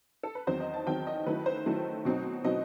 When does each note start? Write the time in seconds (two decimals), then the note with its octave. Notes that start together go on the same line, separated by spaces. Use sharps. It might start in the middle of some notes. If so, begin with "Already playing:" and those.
0.23 A4
0.35 B4
0.47 E2 D#3 F#3 C4 C5
0.60 D#5
0.74 A5
0.86 E2 D#3 F#3 C4 G5
1.07 D#5
1.26 D#3 F#3 A3 E4 B4
1.46 C5
1.66 D#3 F#3 A3 E4
2.05 B2 F#3 C4 D#4
2.44 B2 F#3 C4 D#4 D#5